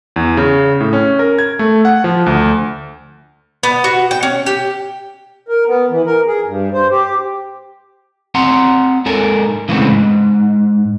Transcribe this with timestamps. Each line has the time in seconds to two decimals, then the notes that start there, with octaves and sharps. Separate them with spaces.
0.16 E2
0.37 C#3
0.80 A2
0.93 C#4
1.19 A#4
1.38 G#6
1.59 A3
1.85 F#5
2.04 F3
2.26 D2
3.63 B3
3.84 F#4
4.11 G5
4.23 C#4
4.46 G4
5.48 A#4
5.67 B3
5.90 E3
6.06 A#4
6.27 G#4
6.46 G2
6.73 C5
6.91 G4
8.35 C4 F#5 A#5 C6
9.06 G#2 A4 A#4 G#5
9.69 C#3 E3 G#3 A3 B3 C4
9.88 G#2